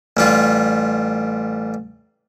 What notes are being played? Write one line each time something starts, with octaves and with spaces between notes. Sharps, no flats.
A1 G3 F4